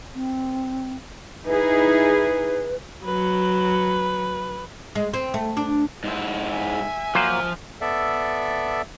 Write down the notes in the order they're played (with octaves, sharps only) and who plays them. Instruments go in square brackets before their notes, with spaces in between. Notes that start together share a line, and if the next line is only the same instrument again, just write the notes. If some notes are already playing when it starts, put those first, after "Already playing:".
[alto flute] C4
[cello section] D#4 E4 G#4 [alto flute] B4
[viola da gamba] F#3 [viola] B4
[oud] G#3
C4
A3
D4
[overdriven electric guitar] G#2 E4
[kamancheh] E5 G#5
[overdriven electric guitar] F3 [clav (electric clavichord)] F#3 A#3 C5
[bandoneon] B3 A4 D5 E5